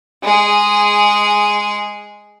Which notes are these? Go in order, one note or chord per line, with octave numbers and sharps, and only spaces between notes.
G#3 G#4